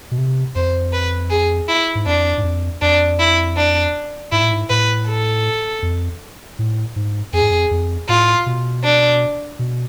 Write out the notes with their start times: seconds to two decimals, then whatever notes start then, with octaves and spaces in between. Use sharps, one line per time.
0.11 B2
0.18 C3
0.55 F2 C5
0.93 B4
1.31 G#4
1.68 E4
1.95 G#2
2.06 F2 D4
2.38 G#2
2.44 F2
2.82 F2 D4
3.19 E4
3.57 D4
4.32 G#2 E4
4.42 A2
4.52 G#2
4.70 A2 B4
5.08 A4
5.82 F2
6.59 A2
6.96 G#2
7.33 F2 G#4
7.42 G#2
7.51 F2
7.71 F2
8.09 A2 F4
8.46 B2
8.84 D4
9.59 B2